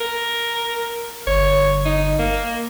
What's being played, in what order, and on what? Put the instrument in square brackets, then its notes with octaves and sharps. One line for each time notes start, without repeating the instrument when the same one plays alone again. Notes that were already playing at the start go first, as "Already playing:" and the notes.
[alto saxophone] A#4
[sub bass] G1 [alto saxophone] C#5
[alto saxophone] D#4
A#3